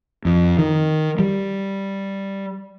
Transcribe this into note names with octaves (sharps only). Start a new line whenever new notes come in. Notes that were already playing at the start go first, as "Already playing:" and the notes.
F2
D#3
G3